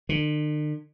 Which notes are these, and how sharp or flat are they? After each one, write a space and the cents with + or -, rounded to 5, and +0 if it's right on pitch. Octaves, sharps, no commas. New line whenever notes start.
D3 +45